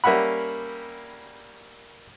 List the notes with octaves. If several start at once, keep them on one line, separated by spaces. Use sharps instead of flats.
G3 A#3 C#4 E5 F#5 B5